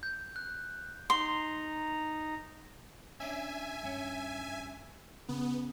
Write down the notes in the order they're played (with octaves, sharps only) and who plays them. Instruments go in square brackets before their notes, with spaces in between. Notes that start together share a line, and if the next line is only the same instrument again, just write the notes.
[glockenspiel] G6
F#6
[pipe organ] D#4 A#5 [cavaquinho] C6
[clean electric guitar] C#4 D4 [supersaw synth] E5 G#5
[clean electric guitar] G2 C#4
[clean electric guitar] C#3 [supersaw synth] B3